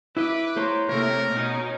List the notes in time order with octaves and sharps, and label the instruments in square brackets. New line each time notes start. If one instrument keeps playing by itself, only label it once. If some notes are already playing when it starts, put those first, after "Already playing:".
[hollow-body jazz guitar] E4 D#5 [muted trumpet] B4 [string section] D6
[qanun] C5 C#5 A#5
[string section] C3 A3 A#3 [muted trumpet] A#4 [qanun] C#5
[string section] B2 C#4 D#4